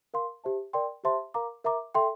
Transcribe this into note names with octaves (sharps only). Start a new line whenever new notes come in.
A#4 F5 C6
G4 C5 E5 A5
A#4 D5 G5 C6
G4 C5 E5 A5 C6
A#4 F5 A#5 D6
A#4 E5 A#5 D6
A4 E5 G5 C6